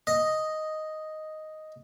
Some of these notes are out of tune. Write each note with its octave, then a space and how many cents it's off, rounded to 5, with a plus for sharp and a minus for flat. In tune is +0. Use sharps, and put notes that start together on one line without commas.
D#5 +0